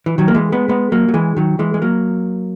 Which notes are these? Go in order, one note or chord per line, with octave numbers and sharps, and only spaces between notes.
E3
D#3 F#3
A#3
E3 G#3
G#3 B3
G#3 B3
F#3 A#3
F#3
E3 G#3
D#3 F#3
E3 G#3
G#3
F#3 A#3